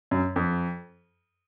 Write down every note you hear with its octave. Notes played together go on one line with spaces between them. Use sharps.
F#2
F2